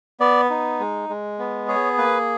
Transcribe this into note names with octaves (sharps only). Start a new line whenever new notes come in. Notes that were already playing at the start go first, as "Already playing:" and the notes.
B3 D5
D#4
G#3
G#3
B3
G#4 C#5
A#3 B4